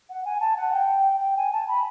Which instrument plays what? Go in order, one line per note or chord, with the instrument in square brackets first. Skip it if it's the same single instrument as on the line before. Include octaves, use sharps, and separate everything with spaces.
[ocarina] F#5
G#5
A5
F#5
G5
G5
G#5
A5
B5